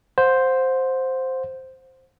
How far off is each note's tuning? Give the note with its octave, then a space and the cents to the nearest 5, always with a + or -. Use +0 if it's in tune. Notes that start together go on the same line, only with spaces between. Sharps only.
C5 +0 F#5 -35